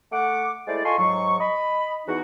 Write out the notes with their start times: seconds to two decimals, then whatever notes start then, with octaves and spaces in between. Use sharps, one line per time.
0.12 A3 F#5 D6
0.68 G#3 A3 E4 C5 D5
0.84 F4 A4 D#5 G#5 C6 C#6
0.98 G#2 F#3 C#6
1.40 D#5 B5
2.07 E2 D#4 F#4